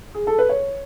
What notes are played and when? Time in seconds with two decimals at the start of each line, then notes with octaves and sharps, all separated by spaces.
0.15 G#4
0.27 A4
0.39 B4
0.49 C#5